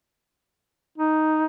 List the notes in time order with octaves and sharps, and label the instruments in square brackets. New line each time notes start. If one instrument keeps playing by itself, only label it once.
[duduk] D#4